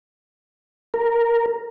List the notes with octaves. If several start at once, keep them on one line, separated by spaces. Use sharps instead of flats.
A#4